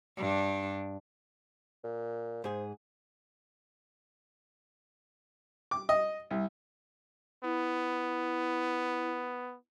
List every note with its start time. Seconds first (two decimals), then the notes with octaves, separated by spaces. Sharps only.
0.17 G2 D4
1.84 A#2
2.44 G#2 G#4 C5
5.71 D6
5.89 D#5
6.31 C2
7.43 B3 E4